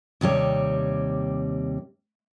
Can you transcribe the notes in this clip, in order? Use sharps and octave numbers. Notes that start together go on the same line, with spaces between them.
D#2 C3 G3 C#5